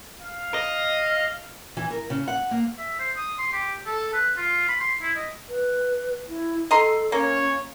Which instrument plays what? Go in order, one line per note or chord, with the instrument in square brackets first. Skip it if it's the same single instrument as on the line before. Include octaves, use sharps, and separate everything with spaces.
[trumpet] F5
[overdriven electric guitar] D#5
[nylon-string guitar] E3
A#4
C#3
F#5
A#3
[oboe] E5
C5
D#6
C6
G4
A4
B4
F4
B5
C6
E4
D#5
[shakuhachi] B4
E4
[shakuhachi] A4 [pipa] D#5 A#5 C6
[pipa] A#3 [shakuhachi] C#4 [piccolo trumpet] C#5